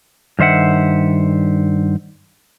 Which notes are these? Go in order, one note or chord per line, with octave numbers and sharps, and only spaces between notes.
G2 D#3 C5 E5 F#5